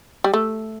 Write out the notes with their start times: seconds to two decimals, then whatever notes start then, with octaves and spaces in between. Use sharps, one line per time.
0.24 G3
0.34 A3